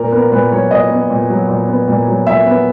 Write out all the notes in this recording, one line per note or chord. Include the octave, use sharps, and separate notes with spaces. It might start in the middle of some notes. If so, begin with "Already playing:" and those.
Already playing: A#2 A#4
B3 A#4
A#2 B4
F#3 C#5
A#2 D#5
B3
A#2
F#3
A#2
B3
A#2
F#3
A#2 E5
B3